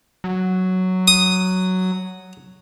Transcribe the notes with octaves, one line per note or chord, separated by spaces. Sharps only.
F#3
D#6